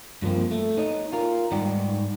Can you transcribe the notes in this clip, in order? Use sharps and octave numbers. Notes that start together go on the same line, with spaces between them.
G2 F3 A#3 C4
A3
D#4 C#5 D#5
F4 A#4
G#2 G3 D#4 D5 F#5 G5